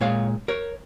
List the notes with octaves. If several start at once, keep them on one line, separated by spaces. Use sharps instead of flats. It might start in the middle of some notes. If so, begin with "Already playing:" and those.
A#2 G#3 C#5 F5
A#4 C#5